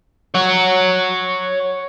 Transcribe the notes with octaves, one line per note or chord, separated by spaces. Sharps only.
C#5 F#5